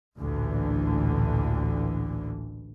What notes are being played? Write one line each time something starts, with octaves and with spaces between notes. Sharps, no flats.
A1 D2 A#2 D3 E3